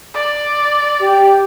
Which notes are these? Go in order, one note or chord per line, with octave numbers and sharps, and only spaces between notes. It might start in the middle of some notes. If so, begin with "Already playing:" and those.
D5
G4